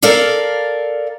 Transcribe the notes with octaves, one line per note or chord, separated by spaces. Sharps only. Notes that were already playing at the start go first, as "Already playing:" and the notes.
A4 A#4 D5 F5